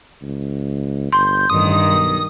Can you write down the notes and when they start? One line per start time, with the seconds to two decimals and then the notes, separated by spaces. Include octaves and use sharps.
0.22 C#2
1.12 G1 C6 G6
1.50 A1 G2 D#3 D#6
1.86 B1